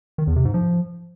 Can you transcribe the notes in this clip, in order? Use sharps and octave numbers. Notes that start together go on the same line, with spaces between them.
D#3
E2
C3
G#2
F3